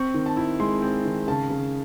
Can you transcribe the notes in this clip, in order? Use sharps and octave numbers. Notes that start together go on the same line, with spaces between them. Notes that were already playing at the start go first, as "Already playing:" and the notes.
Already playing: C4 C#6
D#3
A5
E4
G#3 C6
C4
D#3
C#3 A5
C#3